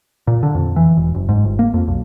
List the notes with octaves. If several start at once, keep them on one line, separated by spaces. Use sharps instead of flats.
A#2
D3
F2
E3
E1
F#1
G#2
G1
A#3
F2
B1